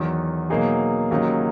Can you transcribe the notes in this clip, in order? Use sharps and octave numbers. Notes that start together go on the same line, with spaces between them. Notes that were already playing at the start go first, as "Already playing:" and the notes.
Already playing: E2 D#3 F#3
B2 F#3 A#3 D#4 G#4
D#2 C#3 F#3 A#3 D#4